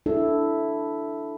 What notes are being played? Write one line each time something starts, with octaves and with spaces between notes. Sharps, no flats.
D4 E4 A4